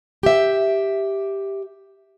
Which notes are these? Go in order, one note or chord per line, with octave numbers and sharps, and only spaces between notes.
G4 E5